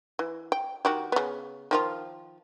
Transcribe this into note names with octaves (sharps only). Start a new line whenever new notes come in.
E3
G5
D#3 F#4 G4
C#3 B3
D#3 F3 F4